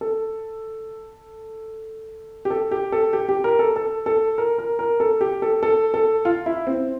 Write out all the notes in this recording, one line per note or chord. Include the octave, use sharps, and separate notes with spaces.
A4
G4
A4
G4
A4
G4
G4
A#4
A4
A4
A4
A#4
A#4
A#4
A4
G4
A4
A4
A4
F4
E4
C4